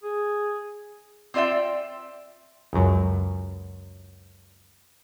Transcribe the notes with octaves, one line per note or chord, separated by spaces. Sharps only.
G#4
C4 F4 D5 E5 G5
C#2 F#2